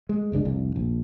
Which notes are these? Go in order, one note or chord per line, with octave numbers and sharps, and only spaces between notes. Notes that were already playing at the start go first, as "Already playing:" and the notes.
G#3
G1 C#2 G#3 D4
F1 C2
A#1